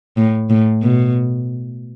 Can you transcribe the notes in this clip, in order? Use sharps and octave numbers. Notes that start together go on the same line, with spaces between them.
A2
A2
B2